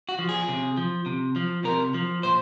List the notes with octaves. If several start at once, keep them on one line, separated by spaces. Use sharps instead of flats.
F#4
F3
G#4
C3
F3
C3
F3
C3 A#4
F3
A#2 C5